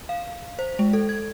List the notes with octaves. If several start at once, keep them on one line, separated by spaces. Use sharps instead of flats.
F5
C5
G#3
A4
G#6